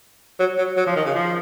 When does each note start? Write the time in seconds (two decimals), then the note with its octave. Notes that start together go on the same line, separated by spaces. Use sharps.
0.40 F#3
0.58 F#3
0.77 F#3
0.87 F3
0.96 D#3
1.05 C#3
1.15 F3